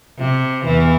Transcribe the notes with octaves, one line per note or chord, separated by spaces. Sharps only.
C3
E2 E3